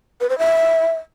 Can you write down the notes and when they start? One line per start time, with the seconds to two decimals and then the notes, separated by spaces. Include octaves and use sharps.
0.21 B4
0.30 C5
0.38 E5